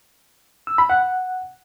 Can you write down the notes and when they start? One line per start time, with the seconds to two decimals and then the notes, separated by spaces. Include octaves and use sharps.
0.67 E6
0.78 B5
0.90 F#5